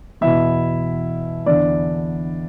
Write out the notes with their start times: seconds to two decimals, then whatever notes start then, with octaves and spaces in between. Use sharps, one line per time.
0.21 E2 B2 E4 E5
1.46 E2 D3 D4 D5